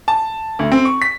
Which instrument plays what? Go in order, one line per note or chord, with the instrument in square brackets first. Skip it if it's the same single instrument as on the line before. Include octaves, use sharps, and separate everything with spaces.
[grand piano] A5
D2
C4
C#6
B6